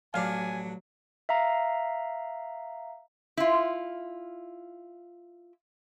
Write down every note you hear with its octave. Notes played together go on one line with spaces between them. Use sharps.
A1 F#3 D4 D5 F5 G#5
E5 F5 A#5
E4 F4